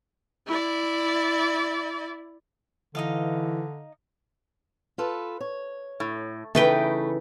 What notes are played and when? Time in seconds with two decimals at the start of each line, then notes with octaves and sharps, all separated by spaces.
0.47 E4 D5
2.95 D3 E3 D#4 D#5 F5
4.98 F4 A4 B4
5.40 C#5
6.00 A2
6.55 C#3 E3 A3 D#4 B4 G5